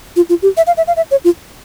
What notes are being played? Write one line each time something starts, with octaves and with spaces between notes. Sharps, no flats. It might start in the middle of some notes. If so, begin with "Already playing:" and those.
F4
F4
G4
E5
F5
E5
F5
E5
C#5
F4